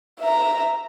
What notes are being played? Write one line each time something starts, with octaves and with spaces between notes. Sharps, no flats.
E5 A#5